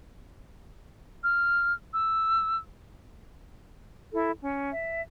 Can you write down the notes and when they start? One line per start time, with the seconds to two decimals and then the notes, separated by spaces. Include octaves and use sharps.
1.23 F6
1.93 E6
4.13 E4 A4
4.41 C#4
4.73 E5